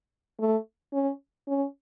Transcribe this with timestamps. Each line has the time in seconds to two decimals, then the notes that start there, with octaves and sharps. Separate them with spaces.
0.40 A3
0.93 C#4
1.47 C#4